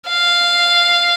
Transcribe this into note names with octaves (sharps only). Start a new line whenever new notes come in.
F5